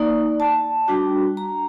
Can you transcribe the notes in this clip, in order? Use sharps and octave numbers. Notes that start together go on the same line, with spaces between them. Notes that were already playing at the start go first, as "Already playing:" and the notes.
Already playing: A#3 D#4 D5
A5
G3 D4 F#4 G5
A#5